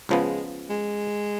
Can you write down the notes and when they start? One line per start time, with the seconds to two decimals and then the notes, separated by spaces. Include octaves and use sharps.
0.09 C#2 C#3 F3 G#3 B3
0.70 G#3